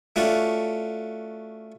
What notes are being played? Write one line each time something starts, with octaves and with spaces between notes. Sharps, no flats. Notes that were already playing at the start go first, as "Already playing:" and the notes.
A3 C#4 D4 F4 F#4